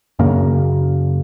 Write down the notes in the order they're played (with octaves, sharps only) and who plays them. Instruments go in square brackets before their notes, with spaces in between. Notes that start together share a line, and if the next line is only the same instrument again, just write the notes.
[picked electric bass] F#2 C#3 A#3